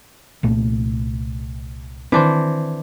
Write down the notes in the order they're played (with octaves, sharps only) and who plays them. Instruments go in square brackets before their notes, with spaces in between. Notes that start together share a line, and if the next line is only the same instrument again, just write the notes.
[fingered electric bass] C2 A#2 A3
[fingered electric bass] D#3 C4 [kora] E3 D4 C5